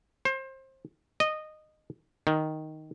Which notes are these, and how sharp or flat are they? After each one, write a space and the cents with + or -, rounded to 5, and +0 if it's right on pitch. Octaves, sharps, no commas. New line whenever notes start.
C5 +25
D#5 -15
D#3 +0